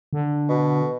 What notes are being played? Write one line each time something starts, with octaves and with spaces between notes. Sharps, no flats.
D3
B2